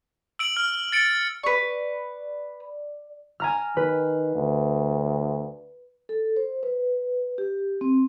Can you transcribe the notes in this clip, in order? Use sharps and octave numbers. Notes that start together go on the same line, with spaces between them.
E6 D7 F#7
F6
A6 C#7 D7
B4 D5 C#6
G#5 A#5 F6
D#3 B4
D2
A4
C5
B4
G4
C4